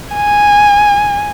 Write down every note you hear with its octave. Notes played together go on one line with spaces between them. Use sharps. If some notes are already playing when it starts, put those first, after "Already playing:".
G#5